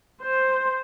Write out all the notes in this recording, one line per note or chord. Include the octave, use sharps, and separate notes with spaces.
C5